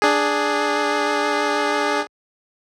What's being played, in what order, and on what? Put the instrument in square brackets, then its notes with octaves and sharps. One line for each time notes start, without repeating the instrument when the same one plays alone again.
[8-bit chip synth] D4 G#4